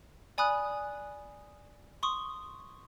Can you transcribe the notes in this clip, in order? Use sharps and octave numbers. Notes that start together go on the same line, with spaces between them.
D5 G#5 B5 D#6 F#6
C6 C#6 D#6